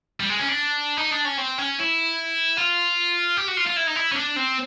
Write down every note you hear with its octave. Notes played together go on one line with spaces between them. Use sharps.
G3
G#3
C#4
D4
D#4
D4
C#4
C4
C#4
E4
F4
G4
F#4
F4
F4
E4
D#4
E4
C#4
D4
C4